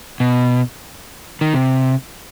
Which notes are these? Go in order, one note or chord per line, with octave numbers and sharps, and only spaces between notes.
B2
D#3
C3